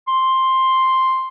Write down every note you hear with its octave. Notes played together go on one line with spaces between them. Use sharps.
C6